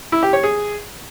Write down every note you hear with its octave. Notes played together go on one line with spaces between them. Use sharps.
E4
G4
C#5
G#4